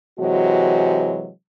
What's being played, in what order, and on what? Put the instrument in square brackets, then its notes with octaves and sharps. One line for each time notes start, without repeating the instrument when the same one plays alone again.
[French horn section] C3 E3 F#3 G#3 F#4